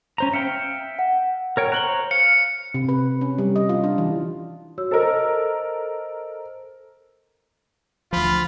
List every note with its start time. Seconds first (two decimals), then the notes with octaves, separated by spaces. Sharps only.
0.18 C#4 C5 A#5
0.33 E5 F5 G5 C#7
0.99 F#5
1.57 A#4 C#5 G5
1.72 C5 C#5 A#5 F#6 F#7 G7
2.11 F5 C#7
2.74 C3
2.89 B4
3.21 C#4
3.38 G3
3.56 D#5
3.69 F4
3.84 D4
3.98 E3
4.78 F#4 C#5 E6
4.91 A4 A#4 C5 D#5 E6
8.13 D2 F3 F4 B5